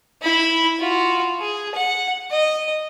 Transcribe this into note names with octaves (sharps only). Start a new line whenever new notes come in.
E4 B5
F4 F#4
G#4
F#5
D#5